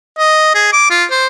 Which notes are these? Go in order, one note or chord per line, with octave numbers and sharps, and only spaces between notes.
D#5
G#4
D6
F4
C5